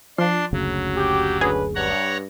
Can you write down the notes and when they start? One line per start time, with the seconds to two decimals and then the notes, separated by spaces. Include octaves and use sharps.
0.18 F3 D4 C6
0.53 F#1 D2 C#3 F#3
0.96 G4
1.41 D3 C#4 G#4 B4
1.75 G2 C#5 F#5 A#5